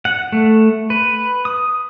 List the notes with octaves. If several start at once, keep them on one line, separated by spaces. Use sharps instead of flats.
F#5
A3
B4
D#6